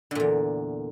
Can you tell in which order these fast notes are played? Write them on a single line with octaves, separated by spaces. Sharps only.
D3 A#2 E2